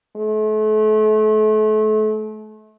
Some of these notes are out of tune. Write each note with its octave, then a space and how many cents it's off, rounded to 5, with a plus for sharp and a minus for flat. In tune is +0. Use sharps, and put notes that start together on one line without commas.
A3 -35